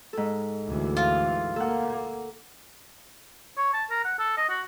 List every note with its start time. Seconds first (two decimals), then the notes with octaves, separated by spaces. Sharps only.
0.13 G#2 A4
0.65 D2 E3
0.97 F4
1.56 A#3 A4 F#5
3.57 C#5
3.73 A5
3.90 A#4
4.04 F#5
4.19 A4
4.37 D#5
4.49 F#4